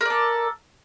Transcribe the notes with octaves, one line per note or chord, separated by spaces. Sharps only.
A4 A#4 D5